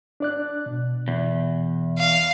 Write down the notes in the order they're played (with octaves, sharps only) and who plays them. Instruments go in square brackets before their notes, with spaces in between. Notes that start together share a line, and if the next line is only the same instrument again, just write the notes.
[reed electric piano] D4 D5 F#6
B2
[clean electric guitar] E2
[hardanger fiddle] F5